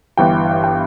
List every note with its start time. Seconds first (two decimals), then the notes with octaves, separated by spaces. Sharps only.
0.17 G1 G2 E3 G5
0.64 G5